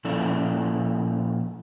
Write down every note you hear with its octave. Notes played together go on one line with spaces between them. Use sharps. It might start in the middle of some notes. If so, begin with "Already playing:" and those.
A#2 F3 C#4 E4 A4 D5